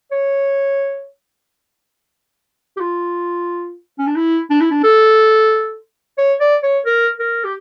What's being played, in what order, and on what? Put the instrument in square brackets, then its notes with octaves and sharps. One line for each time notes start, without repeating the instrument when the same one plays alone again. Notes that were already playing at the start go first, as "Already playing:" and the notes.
[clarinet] C#5
G4
F4
C#4
D4
E4
D4
E4
D4
A4
C#5
D5
C#5
A#4
A#4
G4